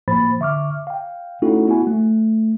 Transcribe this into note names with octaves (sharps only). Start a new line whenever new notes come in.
A2 F3 A#3 C5 B5 A6
D3 E5 C#6 D6 F6
F5 G5
A3 C#4 D#4 E4 F#4 A4
B3 E4 F#4 G#5
A3